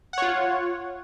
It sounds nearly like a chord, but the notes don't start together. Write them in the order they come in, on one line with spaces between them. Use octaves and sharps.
F#5 C#5 F4